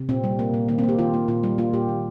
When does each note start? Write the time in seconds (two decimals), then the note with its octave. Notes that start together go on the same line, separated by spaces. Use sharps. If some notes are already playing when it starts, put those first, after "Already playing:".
Already playing: C3
0.09 A#2 C4
0.24 G3
0.39 A#3
0.54 A#2
0.68 D#3 A#3
0.78 C4
0.83 A#3
0.89 G4
0.99 D#3 F4
1.14 A#3
1.28 A#2 F4
1.43 G3
1.58 A#3 F4
1.73 A#2 G4
1.89 D#3